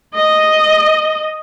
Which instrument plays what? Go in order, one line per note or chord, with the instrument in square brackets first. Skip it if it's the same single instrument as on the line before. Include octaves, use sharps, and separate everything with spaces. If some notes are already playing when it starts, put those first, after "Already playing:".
[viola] D#5